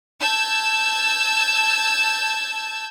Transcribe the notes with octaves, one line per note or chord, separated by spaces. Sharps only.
A5 E6 G6 G#6